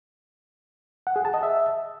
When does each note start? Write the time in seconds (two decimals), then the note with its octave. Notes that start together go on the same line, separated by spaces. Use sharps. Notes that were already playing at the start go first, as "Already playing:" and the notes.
1.07 F#5
1.16 G#4
1.25 A5
1.34 D#5
1.43 E5